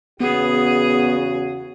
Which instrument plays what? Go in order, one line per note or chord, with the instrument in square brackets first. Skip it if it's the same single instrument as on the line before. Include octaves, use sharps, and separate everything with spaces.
[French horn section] E2 C#3 F#4 [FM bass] B3 [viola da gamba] G#4